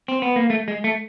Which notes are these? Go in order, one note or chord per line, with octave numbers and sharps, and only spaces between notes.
C4
B3
A#3
A3
G#3
A3